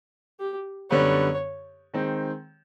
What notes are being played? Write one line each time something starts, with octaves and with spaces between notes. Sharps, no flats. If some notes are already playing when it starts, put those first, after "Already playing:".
G4
F#2 D3 G3 B3 C#5
D#3 G#3 C4